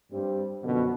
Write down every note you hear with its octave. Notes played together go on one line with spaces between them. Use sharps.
G2 G3 C4
F#2 B2 D3 F3